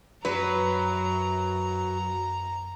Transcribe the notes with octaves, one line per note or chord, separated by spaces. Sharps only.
F#2 F#3 B4 A#5